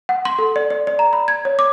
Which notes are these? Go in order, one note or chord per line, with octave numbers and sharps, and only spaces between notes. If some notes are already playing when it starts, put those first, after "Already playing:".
F#5
C6
A4
D5
D5
D5
A#5
B5
G#6
C#5
D6